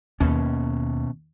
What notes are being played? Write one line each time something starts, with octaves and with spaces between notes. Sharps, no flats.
D#2 B2 C#4